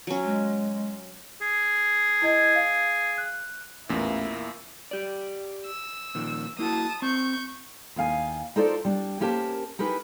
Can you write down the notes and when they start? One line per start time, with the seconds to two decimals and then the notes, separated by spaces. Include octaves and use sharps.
0.07 F#3 C#4
0.24 G#3
1.41 G#4
2.22 E4 D#5 G#6
2.55 F5
3.18 F#6
3.89 A1 E2 A#2 A#3 E4
4.91 G4 D5
5.66 E6
6.15 A#2 D#3 F3
6.59 A#3 E4 F#4 A5 D#6
7.02 C4 C#6 G6
7.96 D#2 D#3 F5 G#5
8.56 D#4 F4 A4 A#4 C5 D5
8.85 G3 D4
9.20 A#3 C#4 G4 A#4 C5 A5
9.79 D#4 G4 A#4 B4 G#5